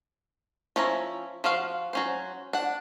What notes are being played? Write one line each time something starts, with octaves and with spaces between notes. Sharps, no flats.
F3 C#4 E4 A#5
F3 F4 F#4 F5
F#3 C#4 C5
D4 F#5